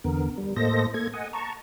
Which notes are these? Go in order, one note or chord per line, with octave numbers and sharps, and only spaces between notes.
E2 D3 B3 A#4
G3
A2 A#3 A4 C5 D#5 A#6
A#3 A4 G#6
D#5 F#5 G#5
A5 A#5 C#6